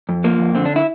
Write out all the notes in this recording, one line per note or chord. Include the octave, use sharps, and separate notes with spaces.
F2
F3 A#3
F2
D3 C4
D4
E4